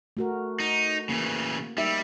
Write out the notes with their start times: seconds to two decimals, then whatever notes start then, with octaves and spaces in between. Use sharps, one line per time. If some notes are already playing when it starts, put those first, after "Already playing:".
0.17 A3 F#4 A#4
0.60 D#4
1.09 C#3 E3 A#3
1.78 G3 D#4 A#4 E5